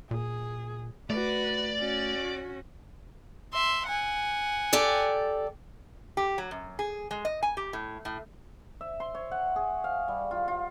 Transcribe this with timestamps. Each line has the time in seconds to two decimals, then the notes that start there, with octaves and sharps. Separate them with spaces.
0.11 A#2 G#4
1.10 A3 F#4 B4 D5
1.79 C#4 F#4
3.53 E5 C6
3.87 F#5 G#5
4.73 G4 A4 D5
6.17 G4
6.38 F#3
6.51 F#2
6.79 G#4
7.11 G#3
7.25 D#5
7.43 G#5
7.57 G4
7.73 A2
8.05 A2
8.81 E5
9.00 C6
9.15 C#5
9.31 F#5
9.56 G#4
9.84 F5
10.08 G3
10.31 F4
10.48 F4